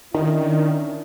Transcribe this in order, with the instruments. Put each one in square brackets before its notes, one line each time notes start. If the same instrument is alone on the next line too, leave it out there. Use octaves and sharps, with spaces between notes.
[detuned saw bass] D#3 [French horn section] C#4 D4 E4